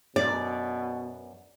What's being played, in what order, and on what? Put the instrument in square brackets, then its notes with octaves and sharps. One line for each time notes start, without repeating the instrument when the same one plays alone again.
[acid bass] F#2 [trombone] B2 [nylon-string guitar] D5